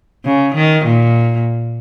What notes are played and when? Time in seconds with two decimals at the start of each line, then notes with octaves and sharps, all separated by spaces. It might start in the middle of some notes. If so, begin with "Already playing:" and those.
0.25 C#3
0.54 D#3
0.84 A#2